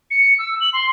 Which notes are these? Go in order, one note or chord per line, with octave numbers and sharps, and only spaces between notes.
C#7
E6
F#7
C6